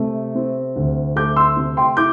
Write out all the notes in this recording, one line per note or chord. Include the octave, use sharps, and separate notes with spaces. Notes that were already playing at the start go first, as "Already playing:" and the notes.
Already playing: C3 A3
C4
D2
A3 D6 G6
C6 E6
C3
G5 C6
E4 D6 G6